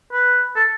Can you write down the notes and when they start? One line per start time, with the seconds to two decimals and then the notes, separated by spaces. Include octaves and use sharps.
0.12 B4
0.56 A4